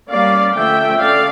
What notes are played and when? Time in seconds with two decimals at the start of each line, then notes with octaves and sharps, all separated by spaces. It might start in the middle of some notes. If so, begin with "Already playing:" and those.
0.09 G3 A#3 C#4 D5 F5
0.54 D3 F3 A3 C#4 E5 G5
0.98 D3 A3 C#4 D5 F5